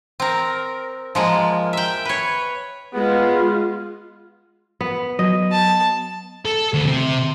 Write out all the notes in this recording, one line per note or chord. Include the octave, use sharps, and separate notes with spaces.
C4 A#4
F3 G#3 A#3
E5 G5
B4 C#5
G#3 B3 F4
B3
F#3 D#5
A5
A4
D2
C3